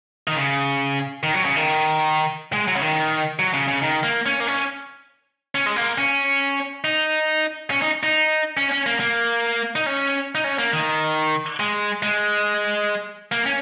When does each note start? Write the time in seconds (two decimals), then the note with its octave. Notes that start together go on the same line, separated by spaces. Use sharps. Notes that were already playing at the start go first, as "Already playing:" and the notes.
0.28 D#3
0.37 C#3
1.23 D#3
1.34 F#3
1.45 C#3
1.56 D#3
2.53 G#3
2.67 F#3
2.75 C#3
2.81 D#3
3.39 F#3
3.54 C#3
3.68 C#3
3.82 D#3
4.03 A#3
4.26 C#4
4.40 A#3
4.47 C#4
5.55 C#4
5.66 G#3
5.76 A#3
5.98 C#4
6.84 D#4
7.71 C#4
7.82 D#4
8.03 D#4
8.57 C#4
8.71 C#4
8.86 A#3
9.00 A#3
9.76 D#4
9.86 C#4
10.35 D#4
10.44 C#4
10.59 A#3
10.73 D#3
11.60 G#3
12.03 G#3
13.32 A#3
13.46 C#4